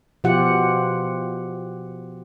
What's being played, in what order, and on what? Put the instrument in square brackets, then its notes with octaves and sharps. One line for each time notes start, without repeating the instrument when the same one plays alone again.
[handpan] B2 F3 F4 G4 F#5